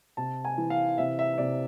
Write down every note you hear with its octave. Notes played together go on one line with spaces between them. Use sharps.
C3 A5
G#5
E3
F5
C3 E5
E5
C3 D5